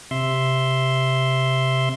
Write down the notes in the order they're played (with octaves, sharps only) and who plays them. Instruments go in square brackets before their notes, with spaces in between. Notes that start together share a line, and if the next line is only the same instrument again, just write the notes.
[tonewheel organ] C3 E5 C6